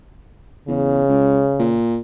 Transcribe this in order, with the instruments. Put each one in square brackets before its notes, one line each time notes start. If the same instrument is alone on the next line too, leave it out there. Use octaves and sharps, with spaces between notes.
[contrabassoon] E2 [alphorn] C#3
[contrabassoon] C#2
A#2